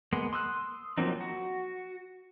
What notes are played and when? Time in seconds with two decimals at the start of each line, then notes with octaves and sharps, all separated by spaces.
0.13 G#3 A#3 B3 C6
0.33 C6 D#6 E6 F#6
0.98 F3 F#3 A#3 C4 D#4
1.21 F#4